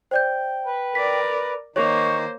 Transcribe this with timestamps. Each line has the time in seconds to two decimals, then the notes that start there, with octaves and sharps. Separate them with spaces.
0.11 C5 D5 G5 G6
0.66 B4
0.95 A#4 D5 B6
1.76 D#3 A#3 D#4 C5 C#5 C#6